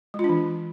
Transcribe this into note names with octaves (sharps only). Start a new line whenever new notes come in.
G#3
F4
D4
E3